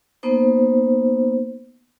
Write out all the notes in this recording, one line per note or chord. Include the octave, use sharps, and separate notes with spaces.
A#3 B3 D#4 C5